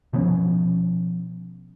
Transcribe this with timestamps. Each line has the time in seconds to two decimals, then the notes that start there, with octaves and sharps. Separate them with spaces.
0.13 B2 F3 B3 C#4